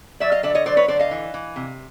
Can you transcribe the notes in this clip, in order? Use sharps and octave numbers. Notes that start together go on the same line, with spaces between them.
F#3 D5 E5
D#5 F5
D3 D5 E5
C#5 D#5
F#3 C5 D5
B4 C#5
D3 C5 D5
D#5 F5
E3
E3
C3